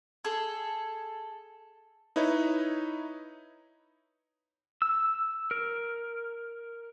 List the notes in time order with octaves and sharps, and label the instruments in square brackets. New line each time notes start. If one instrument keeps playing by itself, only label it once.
[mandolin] G#4 A4
[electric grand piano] D#4 E4 B4 C#5 D#5
[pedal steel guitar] E6
A#4